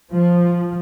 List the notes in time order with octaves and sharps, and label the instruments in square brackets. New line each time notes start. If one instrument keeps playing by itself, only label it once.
[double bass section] F3